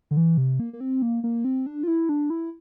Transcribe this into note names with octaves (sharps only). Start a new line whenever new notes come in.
D3
E3
C3
A#3
A#3
C4
A#3
A#3
C4
D4
F4
E4
D4
E4